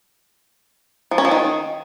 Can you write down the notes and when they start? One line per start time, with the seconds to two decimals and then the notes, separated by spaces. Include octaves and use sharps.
1.11 F3
1.18 C#4
1.25 F3
1.31 D#3